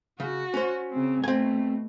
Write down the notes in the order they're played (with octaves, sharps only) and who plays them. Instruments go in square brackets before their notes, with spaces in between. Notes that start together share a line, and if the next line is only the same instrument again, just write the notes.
[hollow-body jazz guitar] C#3 [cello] F#4
[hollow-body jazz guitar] C#4 C5
[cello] C#3 C4
[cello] B2 A3 [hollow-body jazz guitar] C4 G#5